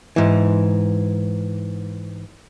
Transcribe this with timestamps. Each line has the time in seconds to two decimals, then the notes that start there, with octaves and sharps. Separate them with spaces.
0.16 G#2 E3